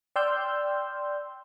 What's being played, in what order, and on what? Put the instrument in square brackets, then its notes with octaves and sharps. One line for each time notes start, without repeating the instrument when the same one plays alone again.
[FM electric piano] D5 G5 C6 E6 F6 G6